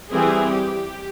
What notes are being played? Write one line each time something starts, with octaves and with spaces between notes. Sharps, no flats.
E3 G3 C4 G#4
G4